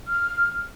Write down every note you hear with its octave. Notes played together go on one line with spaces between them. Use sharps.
F6